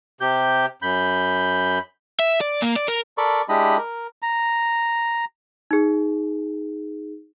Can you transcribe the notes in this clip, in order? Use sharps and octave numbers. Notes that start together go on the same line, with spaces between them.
C3 G4 G6
F#2 B5 G6
E5
D5
A#3
D5
A#4
A4 A#4 D5 B5 C#6
G#3 D4 E4 G4 D#5 B5
A#4
A#5
D#4 G#4